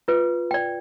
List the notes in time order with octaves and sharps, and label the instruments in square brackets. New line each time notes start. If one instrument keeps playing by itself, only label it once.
[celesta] F4 [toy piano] B4
[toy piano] D5 G5